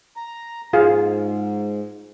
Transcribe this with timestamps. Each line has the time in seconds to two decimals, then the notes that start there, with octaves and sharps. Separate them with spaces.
0.16 A#5
0.73 G#2 F4 G#4 F5